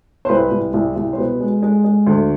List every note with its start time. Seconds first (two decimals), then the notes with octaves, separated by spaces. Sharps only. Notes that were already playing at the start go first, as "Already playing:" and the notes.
0.25 C5
0.29 C2 B4
0.51 C2
0.74 C2
0.96 C2
1.13 C5
1.18 B2 B4
1.40 G#3
1.62 G#3
1.84 G#3
2.07 D2